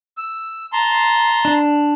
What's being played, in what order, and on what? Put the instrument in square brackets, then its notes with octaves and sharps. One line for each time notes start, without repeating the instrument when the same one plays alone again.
[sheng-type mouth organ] E6
A5 A#5 C6
[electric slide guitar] D4